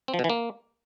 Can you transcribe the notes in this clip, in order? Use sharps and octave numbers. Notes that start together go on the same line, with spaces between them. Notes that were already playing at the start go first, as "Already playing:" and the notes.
C4
F3
B2
E3
A#3